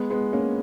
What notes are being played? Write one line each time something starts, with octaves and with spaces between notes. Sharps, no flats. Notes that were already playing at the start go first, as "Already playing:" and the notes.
Already playing: G#3 B3
G#3 B3
A#3 C#4